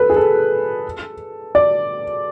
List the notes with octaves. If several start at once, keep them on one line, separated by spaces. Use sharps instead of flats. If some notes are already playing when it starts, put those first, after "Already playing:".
Already playing: A4 B4
G#4
A4
D5